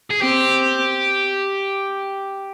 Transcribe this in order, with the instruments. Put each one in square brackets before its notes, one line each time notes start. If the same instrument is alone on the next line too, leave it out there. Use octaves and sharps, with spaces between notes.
[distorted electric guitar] G#4
[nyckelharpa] C4 [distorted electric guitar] G4